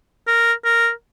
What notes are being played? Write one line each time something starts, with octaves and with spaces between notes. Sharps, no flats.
A#4
A#4